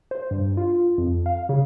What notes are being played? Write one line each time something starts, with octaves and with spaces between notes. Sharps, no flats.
C5
G2
F4
F2
F5
C#3